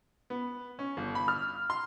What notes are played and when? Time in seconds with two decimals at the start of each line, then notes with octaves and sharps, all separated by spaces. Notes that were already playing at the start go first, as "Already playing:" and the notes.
0.30 B3
0.79 C#4
0.97 G1
1.15 B5
1.28 F6
1.70 C6